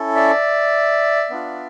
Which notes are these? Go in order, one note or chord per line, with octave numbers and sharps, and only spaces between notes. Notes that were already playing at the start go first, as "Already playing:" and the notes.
Already playing: C#4 E4 A4
D5 E5
B3 D4 F4